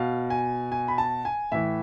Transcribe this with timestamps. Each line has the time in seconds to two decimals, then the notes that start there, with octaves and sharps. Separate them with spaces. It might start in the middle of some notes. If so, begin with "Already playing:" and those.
Already playing: B2 F5
0.30 G#5
0.72 G#5
0.88 B5
0.98 A5
1.25 G#5
1.52 A2 E3 E5